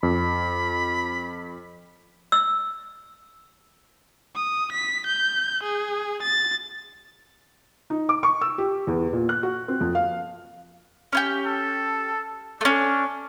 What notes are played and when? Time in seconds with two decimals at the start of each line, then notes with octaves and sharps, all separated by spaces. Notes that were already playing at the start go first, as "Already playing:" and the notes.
0.03 F2 B5
2.32 E6
4.36 D#6
4.72 B6
5.07 G6
5.63 G#4
6.23 A6
7.90 D#4
8.09 D6
8.23 C#6
8.41 E6
8.58 G4
8.87 E2
9.13 A#2
9.29 F#6
9.43 F#4
9.68 C4
9.81 F2
9.95 F5
11.13 C#4 E4 G4
11.46 A4
12.61 A3 C#4 D4